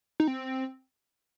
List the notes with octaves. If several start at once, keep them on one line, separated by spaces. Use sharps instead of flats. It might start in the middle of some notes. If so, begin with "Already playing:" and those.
D#4
C4